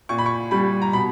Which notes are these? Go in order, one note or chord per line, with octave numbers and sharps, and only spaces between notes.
A#2 C#6
B5
C#6
G3 B5
A#5
B2 B5